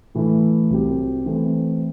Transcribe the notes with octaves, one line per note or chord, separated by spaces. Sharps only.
A2 E3 A3 E4
C2 C3 F#3 C4 G4
E3 A3 C4